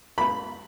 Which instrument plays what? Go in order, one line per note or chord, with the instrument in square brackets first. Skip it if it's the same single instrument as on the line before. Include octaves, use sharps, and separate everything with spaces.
[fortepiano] B5